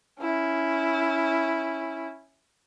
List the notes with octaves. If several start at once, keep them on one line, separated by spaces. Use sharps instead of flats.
C#4 E4